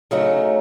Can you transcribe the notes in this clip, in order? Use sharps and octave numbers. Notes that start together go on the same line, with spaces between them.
C#3 F#3 A3 D#4